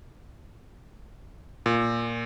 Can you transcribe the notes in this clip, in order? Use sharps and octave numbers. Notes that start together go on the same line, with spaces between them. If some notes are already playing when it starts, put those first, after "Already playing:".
A#2